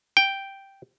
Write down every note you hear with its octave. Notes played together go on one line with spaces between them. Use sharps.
G5